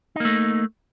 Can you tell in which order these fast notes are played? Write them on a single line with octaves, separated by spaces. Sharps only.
D#4 A#3 A3